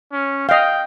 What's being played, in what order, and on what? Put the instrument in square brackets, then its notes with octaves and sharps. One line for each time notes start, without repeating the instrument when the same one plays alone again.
[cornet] C#4
[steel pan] D#5 F5 [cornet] G5